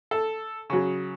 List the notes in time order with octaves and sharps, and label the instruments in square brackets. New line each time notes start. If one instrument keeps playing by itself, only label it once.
[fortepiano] A4
C#3 F#3